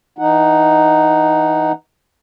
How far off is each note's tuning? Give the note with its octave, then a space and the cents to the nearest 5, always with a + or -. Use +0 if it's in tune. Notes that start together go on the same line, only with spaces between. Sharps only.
E3 -20 D#4 +0 F#5 +0